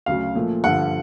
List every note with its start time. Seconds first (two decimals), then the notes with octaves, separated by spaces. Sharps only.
0.06 D2 C#3 F#3 F5
0.35 A#2 F3 A3
0.64 G2 D3 F3 F#5